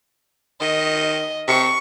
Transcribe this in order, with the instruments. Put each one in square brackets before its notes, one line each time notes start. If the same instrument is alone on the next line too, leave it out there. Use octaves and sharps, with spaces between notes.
[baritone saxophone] D#3 [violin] D#5
[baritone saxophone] C3 [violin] C#6